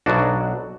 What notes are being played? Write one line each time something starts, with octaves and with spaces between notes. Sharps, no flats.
B1 B2 F#3 D4 F#4